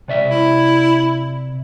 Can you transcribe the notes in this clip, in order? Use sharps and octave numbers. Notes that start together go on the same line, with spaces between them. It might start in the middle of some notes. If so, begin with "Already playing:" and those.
C3 D5 E5
E4